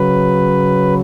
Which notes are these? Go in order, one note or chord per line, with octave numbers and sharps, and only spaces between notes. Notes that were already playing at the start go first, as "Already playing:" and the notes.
Already playing: C#3 F#3 B4